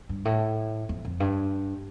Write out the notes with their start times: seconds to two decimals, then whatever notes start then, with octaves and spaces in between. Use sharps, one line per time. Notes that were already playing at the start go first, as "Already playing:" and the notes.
0.09 G2
0.25 A2
0.89 F2
1.05 F2
1.20 G2